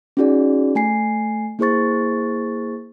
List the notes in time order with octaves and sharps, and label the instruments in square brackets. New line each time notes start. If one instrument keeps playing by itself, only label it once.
[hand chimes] C#4 D#4 F#4 G#4 D5
A3 G#5 C7
A#3 E4 G#4 C5 C#6 A6